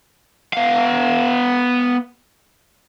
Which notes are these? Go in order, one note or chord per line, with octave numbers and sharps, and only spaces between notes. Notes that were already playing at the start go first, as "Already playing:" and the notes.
B3 F5